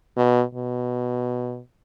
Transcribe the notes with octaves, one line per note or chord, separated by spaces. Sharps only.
B2
B2